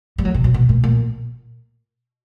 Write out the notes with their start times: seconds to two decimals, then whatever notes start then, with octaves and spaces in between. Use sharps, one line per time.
0.18 G3
0.25 F#3
0.34 C3
0.44 B2
0.54 B2
0.69 A#2
0.84 A#2